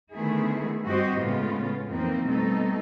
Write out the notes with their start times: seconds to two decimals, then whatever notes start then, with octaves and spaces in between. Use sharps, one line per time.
0.13 D3 D#3 A3 B3 E4 G#4
0.85 G2 C4 F#4 G4 C5 D#5
1.19 A2 C#3 G#3 B3 F4
1.88 F2 E3 F3 A#3 C4 D#4
2.27 B2 G3 A3 C4 D#4 A4